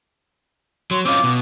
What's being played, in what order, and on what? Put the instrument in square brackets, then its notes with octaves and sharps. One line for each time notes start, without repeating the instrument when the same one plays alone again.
[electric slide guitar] F#3 [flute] C6
[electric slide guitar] C4 C#4 F4 [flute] D6
[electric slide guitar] B2